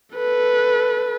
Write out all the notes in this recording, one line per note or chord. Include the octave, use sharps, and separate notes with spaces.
A4 B4